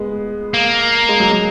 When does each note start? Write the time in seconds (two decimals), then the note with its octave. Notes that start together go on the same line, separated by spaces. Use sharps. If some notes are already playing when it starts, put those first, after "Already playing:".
Already playing: G#3 B3
0.54 A#3
1.09 G#3
1.20 F#3
1.31 G#3